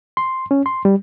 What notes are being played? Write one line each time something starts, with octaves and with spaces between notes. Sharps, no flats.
C6
C#4
C6
G3